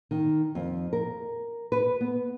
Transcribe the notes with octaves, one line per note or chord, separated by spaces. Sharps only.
D#3
F2
A#4
B4
B3